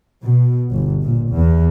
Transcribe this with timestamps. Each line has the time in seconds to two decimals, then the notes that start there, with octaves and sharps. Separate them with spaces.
0.23 B2
0.72 G1
1.03 A#2
1.32 E2